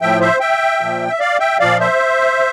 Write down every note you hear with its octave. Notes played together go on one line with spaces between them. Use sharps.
A2 F3 E5 G5
C5 E5
E5 G5
A#2 F3
E5
D5 F5
E5 G5
A#2 F3 D5 F5
C5 E5